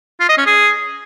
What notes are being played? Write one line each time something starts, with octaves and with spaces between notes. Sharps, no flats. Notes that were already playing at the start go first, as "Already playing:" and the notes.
F4
D#5
C#4
G#4